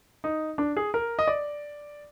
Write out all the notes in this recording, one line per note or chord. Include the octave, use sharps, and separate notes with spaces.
D#4
D4
G#4
A#4
D#5
D5